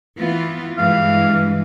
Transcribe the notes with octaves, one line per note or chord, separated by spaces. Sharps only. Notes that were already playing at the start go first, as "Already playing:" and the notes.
E3 B3 F4
G2 E3 G#3 F5